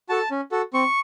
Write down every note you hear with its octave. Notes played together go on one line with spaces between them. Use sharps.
F#4 A4 A5
C#4
F#4 A4
C4 C#6